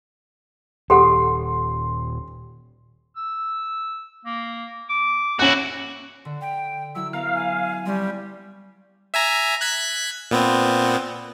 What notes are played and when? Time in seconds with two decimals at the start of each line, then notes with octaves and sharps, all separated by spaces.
0.90 D#1 G4 A4 F#5 C6
3.16 E6
4.25 A#3
4.89 D6
5.39 C#4 E4 F#4 F#6
6.25 D3
6.41 G5
6.95 F#3 E4 E6
7.13 B3 F5 A#5
7.35 G#5
7.86 G3 C4 C#4
9.14 E5 G#5 A#5
9.61 F#6 G#6 B6
10.31 A#2 B3 C4